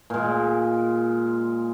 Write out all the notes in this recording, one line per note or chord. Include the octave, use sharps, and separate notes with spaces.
A#2 G#3